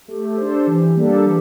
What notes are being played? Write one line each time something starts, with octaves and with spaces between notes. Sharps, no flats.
A3 G4
D4 A4 C5
E3
G3 A#3 D4 A4
E3